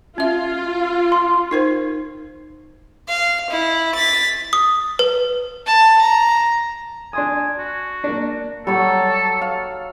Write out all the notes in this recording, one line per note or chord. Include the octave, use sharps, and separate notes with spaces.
C#4 F4 E5
C6
D#4 A#4 C5
F5
E4
A6 B6
D#6
B4
A5
A#5
D4 G#5 C6 D#6
F#4
A#3 D4
F#3 G3 A4 C#5
F5